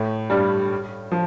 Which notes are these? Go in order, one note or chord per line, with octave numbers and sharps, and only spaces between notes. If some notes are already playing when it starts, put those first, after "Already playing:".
Already playing: A2 A3
G2 G3
F3